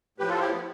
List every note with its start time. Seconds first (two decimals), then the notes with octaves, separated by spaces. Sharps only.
0.18 A2 F3 G4 B4
0.28 F4 A4
0.40 E4 G4
0.49 B3